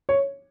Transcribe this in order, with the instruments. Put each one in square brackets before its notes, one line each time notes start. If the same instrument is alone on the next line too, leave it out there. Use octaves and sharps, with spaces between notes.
[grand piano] C#5